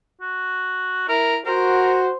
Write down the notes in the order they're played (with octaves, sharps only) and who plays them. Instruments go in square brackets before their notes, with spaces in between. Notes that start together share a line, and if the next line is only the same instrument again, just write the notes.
[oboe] F#4
[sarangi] E4 [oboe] A#4
[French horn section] F#4 [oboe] A#4 [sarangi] C5